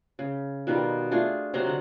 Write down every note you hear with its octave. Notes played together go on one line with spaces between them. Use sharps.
C#3
B2 D#3 G3 F4
A3 D4 F4 G#4
C3 F#3 A#5 C6
D3 F#5